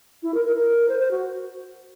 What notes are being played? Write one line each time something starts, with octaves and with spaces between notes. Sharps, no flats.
E4
A#4
A#4
A#4
C5
C5
F#4